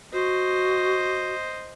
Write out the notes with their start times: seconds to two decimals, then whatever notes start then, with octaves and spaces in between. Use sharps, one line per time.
0.13 F#4 C5 D#5